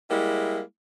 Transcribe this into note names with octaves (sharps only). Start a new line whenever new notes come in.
G3 G#3 A#3 E4